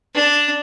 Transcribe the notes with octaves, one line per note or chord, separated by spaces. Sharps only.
D4